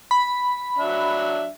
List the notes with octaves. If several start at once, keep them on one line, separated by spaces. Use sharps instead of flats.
B5
F#3 D4 E5